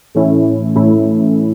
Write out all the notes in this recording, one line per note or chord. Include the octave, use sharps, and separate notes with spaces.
A2 E3 A3 C#4 E4
A2 E3 A3 C#4 E4